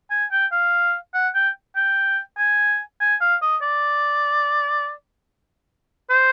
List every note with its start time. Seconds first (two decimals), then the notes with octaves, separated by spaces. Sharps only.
0.10 G#5
0.32 G5
0.52 F5
1.14 F#5
1.35 G5
1.76 G5
2.38 G#5
3.01 G#5
3.21 F5
3.42 D#5
3.62 D5
6.10 C5